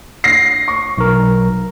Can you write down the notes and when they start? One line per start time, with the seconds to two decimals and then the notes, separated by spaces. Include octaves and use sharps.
0.24 A#6 C7
0.68 C#6
0.98 B1 A#4